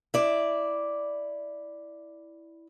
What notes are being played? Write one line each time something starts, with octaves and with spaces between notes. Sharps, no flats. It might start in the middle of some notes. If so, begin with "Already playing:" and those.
E4 D5